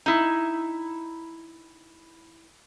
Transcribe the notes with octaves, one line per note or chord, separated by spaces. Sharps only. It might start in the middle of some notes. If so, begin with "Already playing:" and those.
D#4 E4